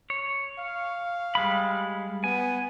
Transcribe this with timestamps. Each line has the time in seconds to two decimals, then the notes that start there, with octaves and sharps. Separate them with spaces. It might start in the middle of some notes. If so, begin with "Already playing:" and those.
0.10 C#5
0.59 F5
1.35 G3 G#3 B5
2.24 B3 G#5